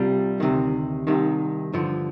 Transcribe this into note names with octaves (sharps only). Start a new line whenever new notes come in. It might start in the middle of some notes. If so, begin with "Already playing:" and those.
Already playing: C2 C3 G3 D4 F4
D2 C3 D#3
C2 C3 D#3
G2 D3 F3